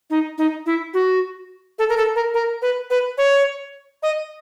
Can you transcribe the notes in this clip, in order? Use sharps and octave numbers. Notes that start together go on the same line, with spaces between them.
D#4
D#4
E4
F#4
A4
A#4
A4
A#4
A#4
B4
B4
C#5
D#5